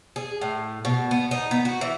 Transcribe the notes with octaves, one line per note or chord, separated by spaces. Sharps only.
G#4
A2
B2
B3
D#4
B3
F#4
E3